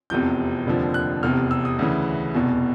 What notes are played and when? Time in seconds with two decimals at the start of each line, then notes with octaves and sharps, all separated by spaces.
0.10 F1 E2 C3 F3 G6
0.66 F1 D#2 D3 F3
0.94 F#6
1.23 F1 E2 C3 F6
1.51 E6
1.65 D#6
1.79 D2 C#3 E3
2.34 F1 E2 B2